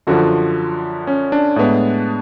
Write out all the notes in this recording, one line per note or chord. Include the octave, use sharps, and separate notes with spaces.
F#2 D3 F3 F#4
C#4
D4
A2 G#3 B3